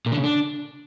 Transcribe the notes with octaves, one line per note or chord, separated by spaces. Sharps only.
A#2
D3
C#3
D4